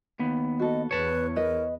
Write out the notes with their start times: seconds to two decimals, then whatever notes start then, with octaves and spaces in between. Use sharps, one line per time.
0.19 D#2 B3
0.59 F#4 A4 D#5
0.91 E2 B4 C#5 A5
1.36 A#4 B4 D#5